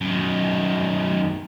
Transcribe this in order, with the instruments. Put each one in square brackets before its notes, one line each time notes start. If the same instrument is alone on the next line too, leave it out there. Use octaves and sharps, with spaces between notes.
[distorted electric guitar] F#2 D#3